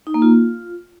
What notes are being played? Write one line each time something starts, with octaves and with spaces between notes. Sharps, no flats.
D#4
A#3
F4